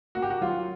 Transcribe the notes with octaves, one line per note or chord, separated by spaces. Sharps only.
A#3 F#4
G4
F#4
F#3 F4